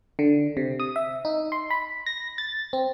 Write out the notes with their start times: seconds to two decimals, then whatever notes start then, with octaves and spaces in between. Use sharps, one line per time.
0.19 D3
0.57 C3
0.80 D#6
0.96 E5
1.25 D#4
1.52 C6
1.70 B5
2.06 A#6
2.38 A6
2.73 C4